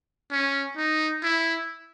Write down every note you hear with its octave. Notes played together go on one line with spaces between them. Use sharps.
C#4
D#4
E4